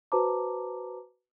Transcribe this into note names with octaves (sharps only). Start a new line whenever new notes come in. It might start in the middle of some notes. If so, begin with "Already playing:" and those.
F#4 B4 C5 A5 A#5 D6